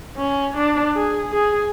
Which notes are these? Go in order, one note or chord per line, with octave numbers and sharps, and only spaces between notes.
C#4
D4
G#4
G#4